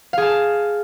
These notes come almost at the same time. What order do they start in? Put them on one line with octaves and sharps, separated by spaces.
F5 G#4 A5